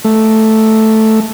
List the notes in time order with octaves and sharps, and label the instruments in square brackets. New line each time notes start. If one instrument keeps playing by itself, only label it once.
[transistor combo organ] A3